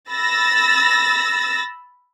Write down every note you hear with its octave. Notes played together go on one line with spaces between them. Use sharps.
B5 E6 A6 A#6